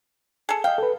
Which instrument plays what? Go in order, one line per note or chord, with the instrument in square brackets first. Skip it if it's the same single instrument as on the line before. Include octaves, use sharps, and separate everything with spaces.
[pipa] G#4 A4
[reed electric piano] D#5 F5 [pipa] G5
[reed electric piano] A4 B4